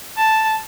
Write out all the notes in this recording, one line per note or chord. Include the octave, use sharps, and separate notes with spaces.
A5